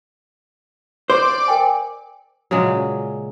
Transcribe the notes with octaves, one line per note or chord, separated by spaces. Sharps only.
C5 D5
A#4 G5 G#5
A#2 C#3 F#3 G#3